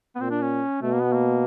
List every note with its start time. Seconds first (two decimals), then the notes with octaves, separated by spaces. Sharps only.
0.15 B3
0.21 A#2 C4
0.31 D4
0.41 C#4
0.82 B2 A3
0.93 A#3
1.03 B3
1.13 A#3